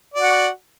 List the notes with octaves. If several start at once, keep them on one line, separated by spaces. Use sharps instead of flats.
F#4 D5 F#5